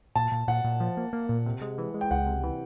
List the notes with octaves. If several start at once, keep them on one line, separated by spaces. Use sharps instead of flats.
A#2 A5
A#2
A#2 F#5
A#2
F3
A#3
A#3
A#2
C3
G#3
E3
G#3
G5
C#2 F#5
C3
E3